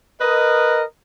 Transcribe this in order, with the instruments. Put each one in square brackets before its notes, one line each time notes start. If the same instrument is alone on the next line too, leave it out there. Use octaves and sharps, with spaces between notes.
[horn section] A#4 B4 D#5